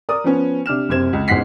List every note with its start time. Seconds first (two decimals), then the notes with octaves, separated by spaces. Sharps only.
0.09 A#4 D5 D#6
0.24 F3 B3 C#4
0.66 C3 D4 F6 E7
0.89 F#1 C3 C4 G#6 E7
1.13 C#2
1.28 A1 G#2 B2 F#5 B6 C7